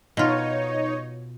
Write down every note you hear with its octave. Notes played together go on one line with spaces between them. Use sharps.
B2 D#4 F4 C#5